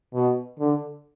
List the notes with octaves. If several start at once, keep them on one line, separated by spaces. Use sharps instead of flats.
B2
D3